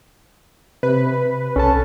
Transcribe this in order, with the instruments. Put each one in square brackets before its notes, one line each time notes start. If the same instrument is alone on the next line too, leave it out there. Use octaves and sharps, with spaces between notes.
[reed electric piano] C3 [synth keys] B4
[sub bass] B1 [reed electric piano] C#4 A4 A5